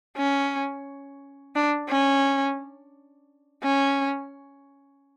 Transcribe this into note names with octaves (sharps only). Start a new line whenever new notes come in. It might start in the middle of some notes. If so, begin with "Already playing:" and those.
C#4
D4
C#4
C#4